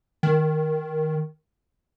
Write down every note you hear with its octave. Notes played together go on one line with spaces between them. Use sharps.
D#3